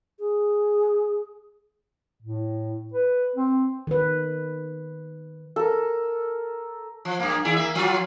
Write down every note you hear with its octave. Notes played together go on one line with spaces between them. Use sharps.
G#4
A2
B4
C4
D#3 B4
A4 A#4
F3
G2 A#3
D#2 E4 G#4
A#3 E5
F3 F#3 F4